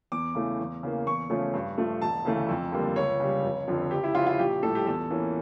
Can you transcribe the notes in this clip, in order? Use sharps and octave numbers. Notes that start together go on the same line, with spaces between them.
E2 D6
C#3 E3 A3
E2
C#3 E3 A#3
E2 C#6
C#3 F3 A3 C#4
G2
F3 A3
E1 A5
D2 C#3 E3 A3
F2
D3 G3 A#3
C#2 C#5
C#3 G3
F1
F2 D3 F3
C#2 G4
E4
C#3 F3 C#4 F4
F4
A#1 G4
A2 G3 A4
G4
E2 A4
E3 A#3 C#4